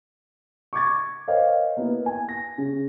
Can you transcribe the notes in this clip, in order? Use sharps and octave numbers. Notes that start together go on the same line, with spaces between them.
C#6 D6 G#6 A6
A#4 C5 C#5 D#5 F5 G5
A#3 B3 E4
G#5
A#6
C#3